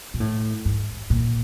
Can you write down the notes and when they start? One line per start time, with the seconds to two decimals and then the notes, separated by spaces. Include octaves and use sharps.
0.14 A#2
0.20 A2
0.65 G#2
1.10 A#2